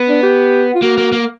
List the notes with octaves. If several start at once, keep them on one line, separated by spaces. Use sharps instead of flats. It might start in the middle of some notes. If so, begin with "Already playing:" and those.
Already playing: B3
D4
G4
F4
A#3 F#4
A#3
A#3